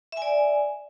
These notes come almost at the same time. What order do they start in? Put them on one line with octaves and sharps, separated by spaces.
E5 G#5 D5